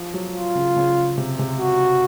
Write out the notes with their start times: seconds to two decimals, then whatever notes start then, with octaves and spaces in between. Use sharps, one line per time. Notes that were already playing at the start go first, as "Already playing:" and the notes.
Already playing: F3
0.14 F#3
0.35 F4
0.55 C#3
0.76 C#3
1.18 C3
1.39 C3
1.59 F#4